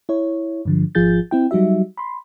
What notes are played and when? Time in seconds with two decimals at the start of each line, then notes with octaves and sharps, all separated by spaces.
0.09 E4 C#5
0.65 G2 D3 F3
0.95 G#1 F3 F4 G#4 G6 A6
1.31 C4 E4 G5
1.51 F#3 G3 D#4 F#4 E5
1.97 B5 C6